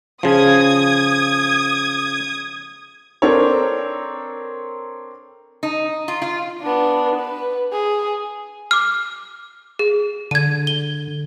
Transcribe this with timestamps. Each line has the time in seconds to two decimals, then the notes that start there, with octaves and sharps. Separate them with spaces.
0.23 C#3 F3 D#6 G#6
3.22 C4 D4 A4 A#4 C#5
5.63 D#4
6.08 F4
6.22 F4
6.61 B3 D4
7.16 B4
7.72 G#4
8.71 D6 F6
9.79 G#4
10.31 D3 G#6 D#7
10.67 G7